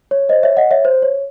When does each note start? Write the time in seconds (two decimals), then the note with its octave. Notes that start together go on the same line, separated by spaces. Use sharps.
0.11 C#5
0.29 C5 D#5
0.43 C#5 E5
0.57 D#5 F#5
0.71 C#5 E5
0.85 C5
1.02 C#5